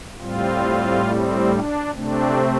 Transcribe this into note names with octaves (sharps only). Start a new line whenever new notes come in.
A2 G3 C4 F4
C4
D4
C3 A3 C4 D4